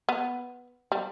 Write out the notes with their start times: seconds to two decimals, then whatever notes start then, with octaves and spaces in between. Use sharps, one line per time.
0.09 B3
0.92 G3